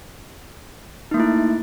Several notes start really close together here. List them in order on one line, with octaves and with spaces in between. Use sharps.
D#4 A#3 A3 E4